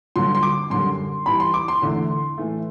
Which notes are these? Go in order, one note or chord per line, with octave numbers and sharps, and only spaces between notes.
G2 D3 F#3 C6
C6
D6
F#2 D3 G3 C6
G2 E3 G3 B5
C6
D6
C6
E2 D3 A3
A2 E3 A3